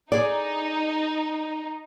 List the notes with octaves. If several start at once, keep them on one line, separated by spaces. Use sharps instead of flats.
D#4 G#4 D5